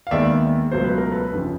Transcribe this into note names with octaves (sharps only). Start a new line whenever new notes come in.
F5
D#2 D#3 G#3 B3 D5 E5
C#2 B2 F#3 A3 C5
B4
A#4
A4 B4
G1 F2 C#3 F3